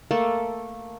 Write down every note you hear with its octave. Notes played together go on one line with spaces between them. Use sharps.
A3 A#3 A4